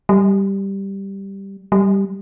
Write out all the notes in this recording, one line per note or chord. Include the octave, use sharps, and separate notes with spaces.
G3
G3